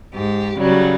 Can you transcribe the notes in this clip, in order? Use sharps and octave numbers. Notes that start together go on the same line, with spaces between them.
G#2 G4
C#3 F#3 G3